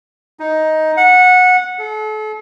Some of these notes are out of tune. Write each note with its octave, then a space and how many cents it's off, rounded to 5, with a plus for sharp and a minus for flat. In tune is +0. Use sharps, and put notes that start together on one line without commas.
D#4 +10
F#5 -15
A4 -40